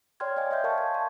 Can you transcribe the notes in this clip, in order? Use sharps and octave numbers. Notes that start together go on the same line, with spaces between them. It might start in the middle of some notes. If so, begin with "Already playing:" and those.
C#5 D5 G5 C6 F6 G#6
D5 D#5 F5 G5 G#5
D#5 E5 C6 G6
A#4 D#5 F5 A5 C#6
G#6
A5